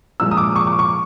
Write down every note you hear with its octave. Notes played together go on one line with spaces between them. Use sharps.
A#2 F3 G#3 E6
D#6
D6
C#6
D6
C#6